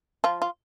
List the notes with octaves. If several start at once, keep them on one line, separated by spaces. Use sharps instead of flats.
F3 F4
F4